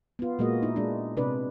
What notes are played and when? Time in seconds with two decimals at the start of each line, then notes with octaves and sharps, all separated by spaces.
0.19 B3 F4
0.39 A#2 G#3 A#3 F#4 D#5
0.63 D#4 E4
0.76 G#3 D4
1.17 C3 D4 B4 D5